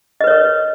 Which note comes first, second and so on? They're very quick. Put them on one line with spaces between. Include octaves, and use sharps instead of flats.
D#5 B4 C#5 A#4